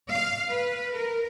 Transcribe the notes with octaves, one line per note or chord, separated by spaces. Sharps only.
F5
B4
A#4